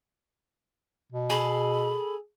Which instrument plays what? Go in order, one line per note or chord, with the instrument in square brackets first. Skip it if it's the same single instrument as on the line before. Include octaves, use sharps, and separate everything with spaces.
[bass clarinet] B2
[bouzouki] G#4 A4 [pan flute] B5